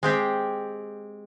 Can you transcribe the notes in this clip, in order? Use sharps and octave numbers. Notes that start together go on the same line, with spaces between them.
G#3 C4 G4